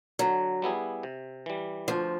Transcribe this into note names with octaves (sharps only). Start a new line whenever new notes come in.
D3 F#3
G3 B3 E4 G#4
C3
E3 G3
D2 F3